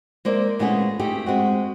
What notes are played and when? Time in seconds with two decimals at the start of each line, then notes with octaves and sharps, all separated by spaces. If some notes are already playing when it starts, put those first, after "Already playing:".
0.25 G#3 A#3 C5 D5 E5
0.59 A#2 G#3 A3 B3 C#4 G#4
0.99 A3 D#4 G4 G#4
1.26 G#3 C4 F#4